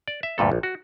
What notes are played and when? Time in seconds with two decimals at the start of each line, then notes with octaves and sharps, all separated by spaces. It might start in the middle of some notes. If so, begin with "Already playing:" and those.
0.08 D5
0.23 E5
0.38 D2 G2 A#2 A4
0.52 A#1
0.63 F#4